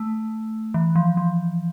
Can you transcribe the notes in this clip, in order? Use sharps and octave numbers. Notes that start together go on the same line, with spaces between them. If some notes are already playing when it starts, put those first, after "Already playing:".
Already playing: A3
E3
F3
F3